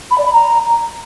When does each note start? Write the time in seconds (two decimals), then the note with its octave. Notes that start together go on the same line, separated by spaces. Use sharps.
0.11 B5
0.18 D5
0.25 B5
0.33 A#5